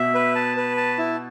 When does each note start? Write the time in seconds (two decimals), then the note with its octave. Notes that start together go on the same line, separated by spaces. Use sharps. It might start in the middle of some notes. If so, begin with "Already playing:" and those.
Already playing: B2 E5
0.14 B4
0.35 A5
0.57 B4
0.77 A5
0.98 E4